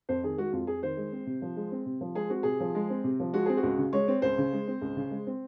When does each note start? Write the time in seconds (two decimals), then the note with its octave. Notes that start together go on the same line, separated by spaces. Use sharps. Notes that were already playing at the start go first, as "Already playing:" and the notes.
0.09 F2 C5
0.23 D#3 G#4
0.38 G#3 F#4
0.52 F2 F4
0.67 F2 G#4
0.82 D#3 C5
0.97 G#3
1.12 C4
1.27 C3
1.42 F3
1.57 G#3
1.72 C4
1.86 C3
2.01 F3
2.15 G#3 G#4
2.30 C4 F#4
2.43 C3 G#4
2.60 F3
2.75 G#3
2.90 C4
3.04 C3
3.20 F3
3.33 G#3 F#4
3.46 C4 G#4
3.57 F#4
3.63 C#2
3.78 C#3
3.93 G#3 C#5
4.08 C4
4.22 C#2 C5
4.38 C#3
4.53 G#3
4.68 C4
4.82 C#2
4.96 C#3
5.11 G#3
5.27 C4